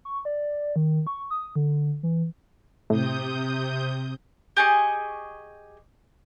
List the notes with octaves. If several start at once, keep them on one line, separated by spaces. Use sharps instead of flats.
C#6
D5
D#3
C#6
D#6
D3
E3
A2 C3 D#6 G6
G4 G#4 D#5 C#6